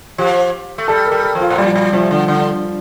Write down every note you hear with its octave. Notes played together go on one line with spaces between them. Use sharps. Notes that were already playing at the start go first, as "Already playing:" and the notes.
F3 G4
A3
G3 A4
A#4
G3
A4
F3
F4
A2
A#2 G3
F3
A#2 G3
C3 F3
D3
D3